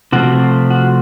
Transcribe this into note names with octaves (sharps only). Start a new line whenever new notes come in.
C3 F3 A3 C4 F#4
F#4